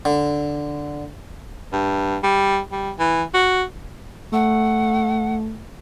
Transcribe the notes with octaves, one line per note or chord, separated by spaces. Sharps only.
D3
G2
G3
G3
E3
F#4
A3 F#5